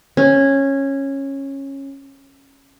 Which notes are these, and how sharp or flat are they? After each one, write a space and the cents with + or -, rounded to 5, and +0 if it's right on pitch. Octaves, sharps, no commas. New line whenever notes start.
C#4 -15